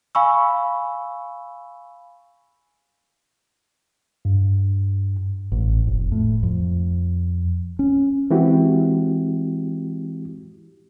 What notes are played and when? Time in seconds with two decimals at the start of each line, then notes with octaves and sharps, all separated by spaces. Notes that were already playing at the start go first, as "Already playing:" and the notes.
0.15 F5 G#5 B5 C#6 E6
4.25 G2
5.52 A1
5.87 F1
6.12 A2
6.43 F2
7.79 C#4
8.31 E3 G#3 C4 E4 F#4 G4